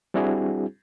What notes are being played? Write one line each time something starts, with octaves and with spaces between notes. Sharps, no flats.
G3 C4 D4 E4 F#4 G#4